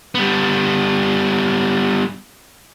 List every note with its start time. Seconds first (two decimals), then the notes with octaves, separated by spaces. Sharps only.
0.15 G3 B3